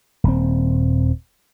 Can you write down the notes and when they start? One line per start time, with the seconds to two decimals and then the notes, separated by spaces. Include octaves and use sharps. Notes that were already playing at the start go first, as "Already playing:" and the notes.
0.24 D#1 C4